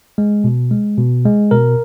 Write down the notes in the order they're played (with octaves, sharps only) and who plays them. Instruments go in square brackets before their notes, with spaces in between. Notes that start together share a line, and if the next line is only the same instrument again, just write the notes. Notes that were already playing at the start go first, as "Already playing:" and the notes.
[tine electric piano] G#3
B2
G#3
B2
G#3
B2 A#4